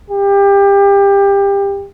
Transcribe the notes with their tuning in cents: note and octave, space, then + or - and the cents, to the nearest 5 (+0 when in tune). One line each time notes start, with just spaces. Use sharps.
G4 +25